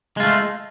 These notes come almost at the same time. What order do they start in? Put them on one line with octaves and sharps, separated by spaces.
G#3 F4 A3